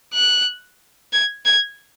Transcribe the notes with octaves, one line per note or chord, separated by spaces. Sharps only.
F#6
G#6
G#6